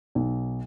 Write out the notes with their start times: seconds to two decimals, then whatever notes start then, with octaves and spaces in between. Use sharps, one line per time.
0.15 B1